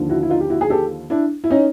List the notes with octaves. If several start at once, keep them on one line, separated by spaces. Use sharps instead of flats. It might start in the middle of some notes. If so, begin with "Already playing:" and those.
Already playing: D#2 D3 F3
E4 F#4
E4
D#4 F4
G4
E4 F#4
G#4
G4 A4
D4 E4
E4
C#4 D#4